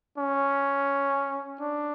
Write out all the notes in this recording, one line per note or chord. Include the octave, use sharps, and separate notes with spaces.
C#4
D4